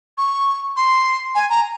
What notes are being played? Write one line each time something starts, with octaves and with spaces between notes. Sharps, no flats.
C#6
C6
G#5
A#5